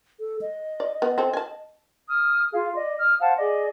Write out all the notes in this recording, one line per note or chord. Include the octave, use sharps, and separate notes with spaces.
A4
D#5
D5
B3
C4 A4
G#5 A5
D#6 F6
F4 G#4 F5
D5 D#5
D#6 F6
C5 F5 F#5 A5
G#4 D5 D#5